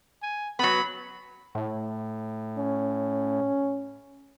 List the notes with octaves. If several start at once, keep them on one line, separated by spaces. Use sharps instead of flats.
G#5
F#3 B3 B5
A2
C#4